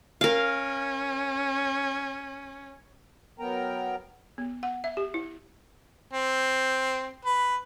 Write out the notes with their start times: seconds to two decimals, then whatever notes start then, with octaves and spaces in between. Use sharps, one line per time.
0.21 C#4 A#4 F5
3.40 F#3 B3 A#4 G5 A#5
4.38 B3
4.63 F#5
4.84 E5
4.97 G4
5.14 E4
6.13 C4
7.25 B4